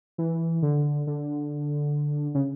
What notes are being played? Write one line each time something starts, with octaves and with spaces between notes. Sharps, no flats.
E3
D3
D3
C#3